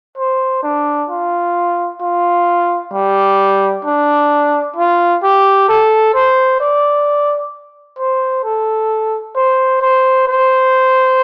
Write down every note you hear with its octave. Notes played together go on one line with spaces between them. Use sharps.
C5
D4
F4
F4
G3
D4
F4
G4
A4
C5
D5
C5
A4
C5
C5
C5